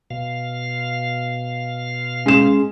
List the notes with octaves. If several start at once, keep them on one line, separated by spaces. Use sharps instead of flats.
B2 F5
G#3 C#4 E7